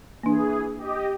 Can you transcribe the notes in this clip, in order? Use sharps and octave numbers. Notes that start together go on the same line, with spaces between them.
E3 A#3 D4 G#4
G4 D#5